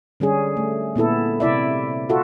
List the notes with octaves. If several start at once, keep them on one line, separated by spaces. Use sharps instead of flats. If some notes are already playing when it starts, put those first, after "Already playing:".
D3 G3 C#4 G#4
A3
A#2 B3 E4 A4
C3 E4 D5 E5
F4 F#4 A4 E5